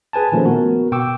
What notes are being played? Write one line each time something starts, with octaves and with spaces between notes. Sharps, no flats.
G#4 B4 G#5 A5
A#2 D#3 F3 A3 C#4
B3 F#4 A#4
B2 G5 C#6 D6 E6